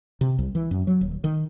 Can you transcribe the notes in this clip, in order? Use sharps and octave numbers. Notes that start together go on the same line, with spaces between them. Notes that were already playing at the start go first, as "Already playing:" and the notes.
C3
C2
E3
F#2
F#3
D#1
D#3